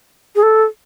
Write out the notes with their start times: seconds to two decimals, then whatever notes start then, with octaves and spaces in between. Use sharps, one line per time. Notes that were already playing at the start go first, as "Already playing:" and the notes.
0.36 G#4
0.43 A4